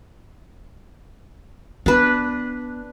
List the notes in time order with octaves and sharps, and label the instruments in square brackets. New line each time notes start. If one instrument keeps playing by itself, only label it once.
[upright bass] B3 [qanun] D4 B4